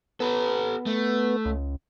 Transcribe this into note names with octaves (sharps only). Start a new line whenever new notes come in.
B3 A4 B4
A3
C#2